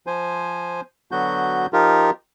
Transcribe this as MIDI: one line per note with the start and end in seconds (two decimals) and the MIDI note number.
0.07 0.81 53
0.07 0.81 72
0.07 0.81 80
1.11 1.66 50
1.11 1.66 54
1.11 1.66 59
1.11 1.66 66
1.11 1.66 91
1.73 2.10 53
1.73 2.10 63
1.73 2.10 65
1.73 2.10 67
1.73 2.10 70